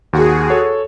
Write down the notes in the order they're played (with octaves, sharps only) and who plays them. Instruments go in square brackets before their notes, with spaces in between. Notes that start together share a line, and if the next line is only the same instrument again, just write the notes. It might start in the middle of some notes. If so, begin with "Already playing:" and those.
[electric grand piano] D#2 [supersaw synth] F#4 G#4
[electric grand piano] A4 C#5